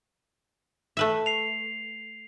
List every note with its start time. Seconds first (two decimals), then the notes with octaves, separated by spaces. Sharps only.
0.97 A3 B4 E5
1.26 C7 F7